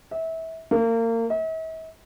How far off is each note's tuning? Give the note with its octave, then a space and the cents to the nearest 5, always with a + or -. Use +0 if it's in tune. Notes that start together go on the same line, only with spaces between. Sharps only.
E5 -25
A#3 -30
E5 -45